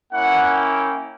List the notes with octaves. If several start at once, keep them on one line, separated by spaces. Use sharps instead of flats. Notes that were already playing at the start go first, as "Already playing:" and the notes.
A#3 C#4 E4 F#5
G5